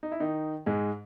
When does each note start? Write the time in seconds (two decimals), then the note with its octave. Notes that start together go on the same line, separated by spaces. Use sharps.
0.03 D#4
0.12 E4
0.20 D#3 D#4
0.66 G#2 G#3